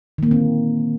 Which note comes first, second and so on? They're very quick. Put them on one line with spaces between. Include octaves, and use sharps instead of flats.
D#3 A#3 D3 C4